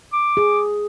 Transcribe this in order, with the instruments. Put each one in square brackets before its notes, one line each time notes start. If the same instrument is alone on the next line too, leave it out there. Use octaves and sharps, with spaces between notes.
[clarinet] D6
[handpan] G#4